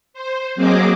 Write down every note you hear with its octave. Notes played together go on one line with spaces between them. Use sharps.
C5
F#3 A#3 C4 G#4 D#5 D6